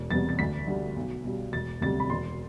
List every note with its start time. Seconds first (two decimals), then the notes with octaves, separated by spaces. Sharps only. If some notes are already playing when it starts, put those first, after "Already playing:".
Already playing: E1
0.10 E2 C3 G3 A6
0.29 A6
0.39 D2 B6
0.67 D3 G3
0.96 B1
1.25 B2 G3
1.53 E1 A6
1.81 D2 C3 G3 A6
2.00 B5
2.10 E1 C6